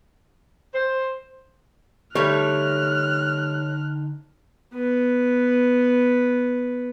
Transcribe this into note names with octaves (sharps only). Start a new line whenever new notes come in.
C5
D3 G3 A3 D#4 C#5 F6 F#6
B3 B4